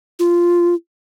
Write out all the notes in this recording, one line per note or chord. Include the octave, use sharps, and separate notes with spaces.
F4